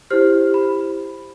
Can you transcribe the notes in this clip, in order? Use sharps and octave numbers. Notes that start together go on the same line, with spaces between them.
E4 G4 C5 F6
B5